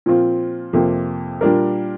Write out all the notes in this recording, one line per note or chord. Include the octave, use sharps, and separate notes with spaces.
A#2 F3 C4 F4
F2 C3 A#3 F4
A#2 G3 D4 A#4